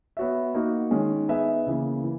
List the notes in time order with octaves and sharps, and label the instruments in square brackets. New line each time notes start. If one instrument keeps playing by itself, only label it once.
[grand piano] B3 F#4 C#5 E5
A#3 D#4 F#4
D#3 G#3 C#4
B3 D#4 G#4 B4 E5
C#3 E3 A#3
E3